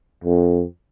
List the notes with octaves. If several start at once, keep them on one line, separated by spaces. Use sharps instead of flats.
F2